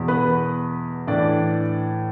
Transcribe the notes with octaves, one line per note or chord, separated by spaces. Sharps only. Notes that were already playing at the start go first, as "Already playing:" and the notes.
Already playing: E2 B2
B3 B4
A2 E3 D4 D5